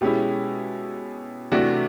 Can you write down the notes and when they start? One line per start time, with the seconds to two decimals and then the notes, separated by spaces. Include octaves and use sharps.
0.01 B2 G#3 C#4 E4 G4
1.52 C3 E3 A3 D4 F#4 G4